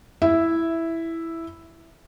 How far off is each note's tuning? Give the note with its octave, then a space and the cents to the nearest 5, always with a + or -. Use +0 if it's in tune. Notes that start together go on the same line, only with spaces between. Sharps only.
E4 +0 E5 +0